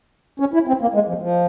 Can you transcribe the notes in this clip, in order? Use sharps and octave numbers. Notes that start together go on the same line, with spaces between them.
C#4
E4
C4
A#3
G#3
F3
F3